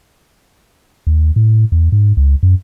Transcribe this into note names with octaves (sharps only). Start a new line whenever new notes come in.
D#2
A2
E2
G#2
C#2
F#2